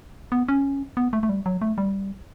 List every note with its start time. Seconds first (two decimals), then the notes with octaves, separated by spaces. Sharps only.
0.32 B3
0.48 C#4
0.97 B3
1.13 A3
1.23 A3
1.29 G3
1.46 F#3
1.62 A3
1.78 G3